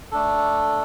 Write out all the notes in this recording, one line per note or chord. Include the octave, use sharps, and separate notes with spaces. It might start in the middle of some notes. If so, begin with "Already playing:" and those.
A3 D4 A4